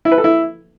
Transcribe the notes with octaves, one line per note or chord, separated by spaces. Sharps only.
E4
B4
A4
E4